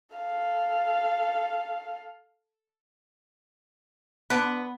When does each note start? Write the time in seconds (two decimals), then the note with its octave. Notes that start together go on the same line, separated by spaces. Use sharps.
0.16 A4 F5
4.30 D3 B3 B4